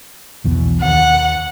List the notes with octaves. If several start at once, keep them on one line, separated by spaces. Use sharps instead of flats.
B1 E2 B2
D#2 F#5